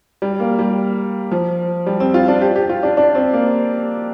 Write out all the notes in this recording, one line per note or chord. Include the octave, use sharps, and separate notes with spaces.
G3
A#3
G3
F3
G3
C4
F4
D4
G4
G4
F4
D4
D4
C4
A#3